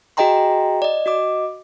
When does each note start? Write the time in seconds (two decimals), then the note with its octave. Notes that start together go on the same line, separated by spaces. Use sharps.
0.17 F#4 G#4 D#5 G5 A#5 C6
0.82 D5 D#5
1.06 F#4 D#5 D6